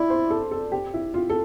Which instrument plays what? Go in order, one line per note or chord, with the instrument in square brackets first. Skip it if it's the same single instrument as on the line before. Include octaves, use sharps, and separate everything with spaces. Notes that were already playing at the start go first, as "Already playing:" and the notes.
Already playing: [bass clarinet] E4 [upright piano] D5
[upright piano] C5
A4
A4
G4
E4
F4
A4